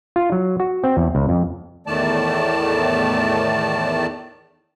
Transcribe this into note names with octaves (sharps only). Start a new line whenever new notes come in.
F4
F#3
F#4
C4
E2
C#2
F2
E2 A2 D#3 A3 D5 A5